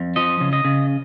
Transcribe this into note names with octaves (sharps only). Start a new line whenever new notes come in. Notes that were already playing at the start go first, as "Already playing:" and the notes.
Already playing: F2
F3 D#5
C#3
D#5
C#3